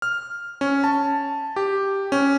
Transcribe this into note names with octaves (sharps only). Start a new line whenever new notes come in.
F6
C#4
A5
G4
C#4